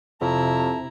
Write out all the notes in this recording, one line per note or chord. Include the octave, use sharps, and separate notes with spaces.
F2 C3 E4 A5 A#5